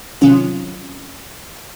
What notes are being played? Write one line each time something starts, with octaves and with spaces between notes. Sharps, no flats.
C3 D#3 F#3 C#4 F4